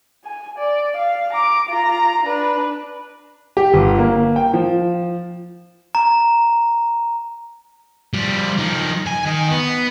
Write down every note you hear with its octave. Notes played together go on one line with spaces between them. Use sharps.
G#5
D5
F5
A#5 D6
F4 A#5
D4 B4
G4
G1
A#3
G5
F3
A#5
F3 G3
F3 D#4
G#5
D#3 D#5
B3